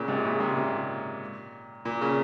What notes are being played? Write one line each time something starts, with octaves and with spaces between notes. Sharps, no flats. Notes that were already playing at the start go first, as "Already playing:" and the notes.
Already playing: A#2 C#3
G#2 C3
A#2 C#3
G#2 C3
A#2
A#2
A#2 C#3